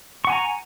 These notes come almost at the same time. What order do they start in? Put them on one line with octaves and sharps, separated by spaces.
C#6 F#5 G#5 A#5